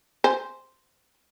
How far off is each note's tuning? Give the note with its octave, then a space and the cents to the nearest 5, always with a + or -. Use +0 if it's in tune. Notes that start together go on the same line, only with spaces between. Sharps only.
C5 +0 G#5 +0